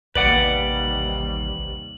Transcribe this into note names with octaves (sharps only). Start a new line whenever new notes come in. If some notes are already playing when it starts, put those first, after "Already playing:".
A1 D#2 C3 G3 B4 D5 F#5 F#7